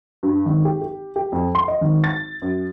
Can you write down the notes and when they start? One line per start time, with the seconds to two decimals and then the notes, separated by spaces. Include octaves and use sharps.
0.23 G2
0.46 G#1
0.65 G4
0.81 G4
1.16 G4
1.32 F2
1.55 C6
1.68 D#5
1.81 G#1
2.04 A6
2.42 F#2